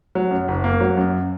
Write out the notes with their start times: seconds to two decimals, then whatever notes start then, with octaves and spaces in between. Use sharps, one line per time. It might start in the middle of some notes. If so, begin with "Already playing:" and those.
0.15 F#3
0.31 F#2
0.48 F#1
0.64 A#3
0.81 F#3
0.97 F#2